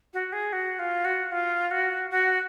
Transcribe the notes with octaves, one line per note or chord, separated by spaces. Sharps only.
F#4
G#4
F#4
F4
F#4
F4
F#4
F#4